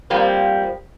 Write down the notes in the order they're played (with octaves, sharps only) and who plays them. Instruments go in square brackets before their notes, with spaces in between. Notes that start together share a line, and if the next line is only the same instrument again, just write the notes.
[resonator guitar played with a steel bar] F3 G3 A#3 C4